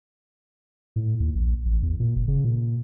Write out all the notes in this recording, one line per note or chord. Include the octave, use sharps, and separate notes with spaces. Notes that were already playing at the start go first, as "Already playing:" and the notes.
A2
D#2
A#1
A1
E2
A#2
F#1
C#3
A#2